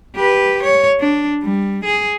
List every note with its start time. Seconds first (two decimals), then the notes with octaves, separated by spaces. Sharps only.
0.16 G4 B4
0.63 C#5
1.00 D4
1.43 G3
1.85 G#4